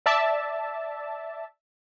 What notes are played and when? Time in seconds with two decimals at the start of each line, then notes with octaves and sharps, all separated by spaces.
0.06 D5 E5 A5